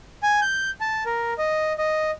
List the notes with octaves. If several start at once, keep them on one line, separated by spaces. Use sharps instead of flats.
G#5
G6
A5
A#4
D#5
D#5